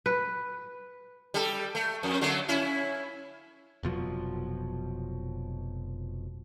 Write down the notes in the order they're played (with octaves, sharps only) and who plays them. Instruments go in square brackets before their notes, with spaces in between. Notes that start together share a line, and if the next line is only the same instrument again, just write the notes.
[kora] B4
[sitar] G3 A4
A3
F2
D3 F#3 A3
C#4 E4
[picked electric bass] F1 B2 F3 F#3